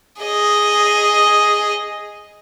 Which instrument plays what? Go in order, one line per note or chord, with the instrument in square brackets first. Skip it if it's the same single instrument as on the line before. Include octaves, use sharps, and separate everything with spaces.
[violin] G#4 D#5